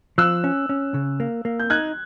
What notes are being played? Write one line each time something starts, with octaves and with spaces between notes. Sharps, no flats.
F3 E6 F#6
C#4
C#4
C#3
A#3
A#3
G6
D#4 F#6 G#6